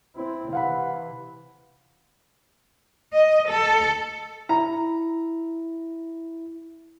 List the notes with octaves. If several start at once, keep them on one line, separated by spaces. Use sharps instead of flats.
C4 E4
C3 E3 F5 F#5 B5
D#5
A4
E4 A#5